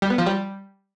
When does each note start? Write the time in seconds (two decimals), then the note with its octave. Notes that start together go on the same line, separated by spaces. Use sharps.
0.02 G3
0.10 B3
0.18 F3
0.26 G3